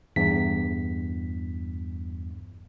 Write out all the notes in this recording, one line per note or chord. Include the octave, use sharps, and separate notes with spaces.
E2 G2 B6